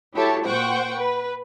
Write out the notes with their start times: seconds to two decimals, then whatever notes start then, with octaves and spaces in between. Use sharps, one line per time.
0.14 E4 F#4 G4 A4 C#5 A5
0.47 A#2 C5 F#5 G5 C#6
0.97 B4